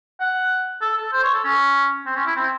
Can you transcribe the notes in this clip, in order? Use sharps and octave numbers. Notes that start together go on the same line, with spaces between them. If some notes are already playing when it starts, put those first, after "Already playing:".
F#5
A4
A4
C5
C#5
A4
C#4
C4
C#4
E4
C4